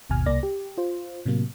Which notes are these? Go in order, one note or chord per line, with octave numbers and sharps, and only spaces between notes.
G#1 D#2 B2 G#5 F6
C2 A#3 D5 A#6
G4
F4 C5
A2 C3 F#3 A#3